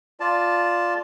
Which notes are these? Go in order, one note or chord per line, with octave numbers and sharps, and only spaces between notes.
F4 D5 A5